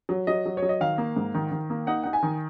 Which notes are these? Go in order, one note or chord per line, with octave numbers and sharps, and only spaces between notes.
F#3
F#3 D#5
F#3
C#5
F#3
D#5
D#3 F5
A#3
G#2
D#3
D#3
A#3
D#4 F#5
D#4 F#5
G#5
D#3